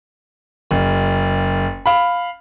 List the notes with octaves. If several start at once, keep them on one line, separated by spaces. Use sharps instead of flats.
F#1
F5 B5